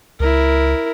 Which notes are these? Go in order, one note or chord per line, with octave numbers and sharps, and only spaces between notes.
C#2 E4 A#4